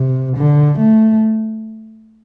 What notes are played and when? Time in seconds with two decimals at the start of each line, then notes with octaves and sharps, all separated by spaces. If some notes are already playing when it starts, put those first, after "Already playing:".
Already playing: C3
0.37 D3
0.79 A3